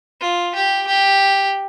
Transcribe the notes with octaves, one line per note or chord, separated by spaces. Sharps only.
F4
G4
G4